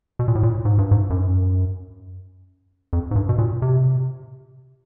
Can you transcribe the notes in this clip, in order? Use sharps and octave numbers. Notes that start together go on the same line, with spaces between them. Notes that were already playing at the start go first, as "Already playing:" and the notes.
B2
A#2
A2
A#2
G#2
G2
G#2
F#2
F2
G#2
G2
B2
A#2
C3